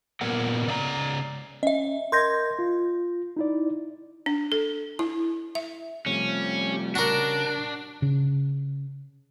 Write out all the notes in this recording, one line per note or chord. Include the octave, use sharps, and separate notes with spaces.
A#2 B3 A#4 F#5
C#3 D5 D#5 A#5
C#4 D#5 E5
A#4 D#5 C6 G6 G#6 A#6
F4
D#4 E4 D5
D4
A4
E4
E5
C3 F3 G3 A3 C#4
C#3 D4 F#4 A#4 A5
C#3